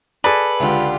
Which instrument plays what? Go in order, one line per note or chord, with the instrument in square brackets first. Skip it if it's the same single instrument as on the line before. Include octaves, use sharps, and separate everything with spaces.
[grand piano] G#4 A4 D5 [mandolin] B4
[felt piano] C#2 D3 [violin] F4 G4